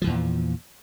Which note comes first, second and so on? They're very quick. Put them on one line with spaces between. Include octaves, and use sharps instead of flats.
F3 E3 E2 A#2